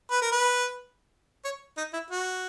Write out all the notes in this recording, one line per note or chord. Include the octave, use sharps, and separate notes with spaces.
B4
A#4
B4
C#5
D#4
E4
F#4